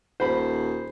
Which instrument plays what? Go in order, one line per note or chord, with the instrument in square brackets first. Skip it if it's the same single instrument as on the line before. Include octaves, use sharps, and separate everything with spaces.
[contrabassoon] D#1 [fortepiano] C5 B5